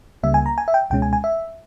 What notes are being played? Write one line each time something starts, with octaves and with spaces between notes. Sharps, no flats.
C#2 C#3 G3 A#3 E5
G#5
A#5
G#5
E5
G5
C#2 B2 G#3 C#4 G5
G#5
G#5
E5